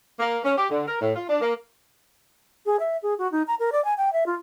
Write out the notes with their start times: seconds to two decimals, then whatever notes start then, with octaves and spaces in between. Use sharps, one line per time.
0.20 A#3
0.44 C#4
0.57 G4
0.70 D3
0.87 A#4
1.01 A2
1.16 F4
1.29 D4
1.41 A#3
2.66 G#4
2.80 E5
3.03 G#4
3.19 F#4
3.32 D#4
3.47 A#5
3.59 A#4
3.72 D5
3.85 G#5
3.98 G5
4.13 E5
4.26 F4